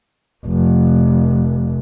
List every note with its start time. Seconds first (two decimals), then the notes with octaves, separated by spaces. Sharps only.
0.46 F1